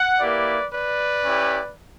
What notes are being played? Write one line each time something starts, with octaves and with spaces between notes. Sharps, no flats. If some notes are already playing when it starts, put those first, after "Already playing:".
Already playing: F#5
A#3 E4 G4 B4 D5
B4 D5
C#4 E4 G4